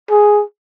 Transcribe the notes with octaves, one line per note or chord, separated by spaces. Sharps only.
G#4